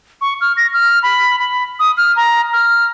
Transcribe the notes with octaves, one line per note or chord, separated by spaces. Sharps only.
C#6
F6
A#6
F6
B5
B5
D#6
F6
A#5
F6